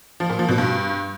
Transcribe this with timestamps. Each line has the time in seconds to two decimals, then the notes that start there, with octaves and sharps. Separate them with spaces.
0.20 F3
0.30 A#2
0.39 F3
0.49 B2
0.58 G2